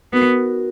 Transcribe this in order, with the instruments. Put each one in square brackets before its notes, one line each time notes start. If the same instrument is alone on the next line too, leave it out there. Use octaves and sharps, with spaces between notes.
[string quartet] B3 [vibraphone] D#4 F#4 A#4